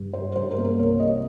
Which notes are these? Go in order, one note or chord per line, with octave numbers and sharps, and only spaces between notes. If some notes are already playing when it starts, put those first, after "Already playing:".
Already playing: G2
G3 C5
G2 C5
A#4
A#3
A#4
C2 C#5
G3 D#5